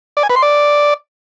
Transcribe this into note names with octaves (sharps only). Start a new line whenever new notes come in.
D5
G#5
B4
C6
D5